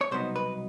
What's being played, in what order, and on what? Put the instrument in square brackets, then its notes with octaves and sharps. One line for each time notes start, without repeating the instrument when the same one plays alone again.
[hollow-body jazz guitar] C#5
C2 B2 F#3 B3 D#4 C5
B4